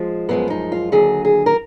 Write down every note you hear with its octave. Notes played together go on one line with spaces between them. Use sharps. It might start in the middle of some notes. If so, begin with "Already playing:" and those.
Already playing: F3 G#3
F#2 F3 G#3 B3
D#4
F4
D#2 D3 F#3 G#4
G#4
A#4